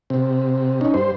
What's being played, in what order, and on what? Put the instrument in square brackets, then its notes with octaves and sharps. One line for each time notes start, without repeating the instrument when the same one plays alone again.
[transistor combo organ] C3
C#4 D#4
G2 C5